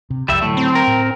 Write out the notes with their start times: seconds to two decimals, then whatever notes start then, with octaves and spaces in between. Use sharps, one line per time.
0.10 C3
0.29 C2 F2 G3 E5
0.42 A2 D3 F#3 A3
0.57 C4
0.75 A#4
0.87 A2